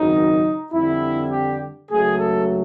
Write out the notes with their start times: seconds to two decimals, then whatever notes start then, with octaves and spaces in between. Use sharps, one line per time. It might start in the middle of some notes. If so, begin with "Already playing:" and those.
Already playing: G#1 F#2 C#3 F#3 D#4
0.73 F2 D3 G3 E4
1.31 G4
1.90 C#2 C#3 F#3 A3 G#4
2.19 A4